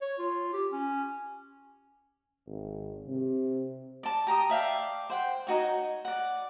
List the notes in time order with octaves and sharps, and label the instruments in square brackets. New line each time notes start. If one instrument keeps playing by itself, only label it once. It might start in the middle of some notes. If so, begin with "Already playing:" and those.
[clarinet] C#5
F4
G4
C#4
[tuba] G#1
C3
[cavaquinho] D5 A5
G4 A#5 C#6 D#6
D5 E5 F5 G5
C5 F#5 G5
D#4 F#4 C#5
D5 F#5